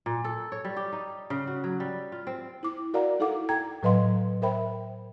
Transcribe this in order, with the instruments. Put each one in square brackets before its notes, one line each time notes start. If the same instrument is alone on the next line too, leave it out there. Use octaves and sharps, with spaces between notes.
[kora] A#2
A4
C#5
G3
G4
D#4
C#3
F#4
F#3
G3
F4
C4
[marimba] E4 D6
F#4 A#4 D5 F5 F#5 A#5
D#4 E4 A4 F5 F#5 D6
G5 A#5 G#6
A2 F#3 B4 D#5 F5 C6
A#4 C5 E5 G5 B5